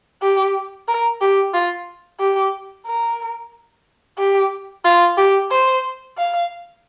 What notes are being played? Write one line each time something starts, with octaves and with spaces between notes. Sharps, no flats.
G4
A#4
G4
F4
G4
A#4
G4
F4
G4
C5
F5